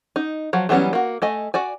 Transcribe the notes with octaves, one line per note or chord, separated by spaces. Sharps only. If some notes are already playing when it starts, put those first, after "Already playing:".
D#4
F3 F#3
E3 F#3 G3 B3 C#4
A#3 F#4
A3 D#5 G#5
F#4 D5 G#5